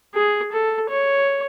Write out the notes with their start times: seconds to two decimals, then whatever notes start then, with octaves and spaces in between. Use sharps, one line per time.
0.15 G#4
0.52 A4
0.90 C#5